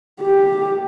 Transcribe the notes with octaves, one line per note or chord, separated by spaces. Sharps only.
G4